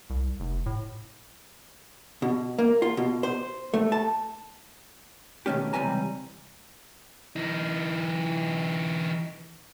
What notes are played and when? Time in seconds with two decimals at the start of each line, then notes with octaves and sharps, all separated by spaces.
0.10 C2
0.40 F1
0.66 A2
2.22 B2
2.59 A#3
2.82 F4
2.97 B2
3.23 C5
3.74 A3
3.92 A5
5.46 B2 D#3 A3 C#4 G4
5.73 C#2 C3 E3 G3 G#5 A#5
7.36 E3 D#4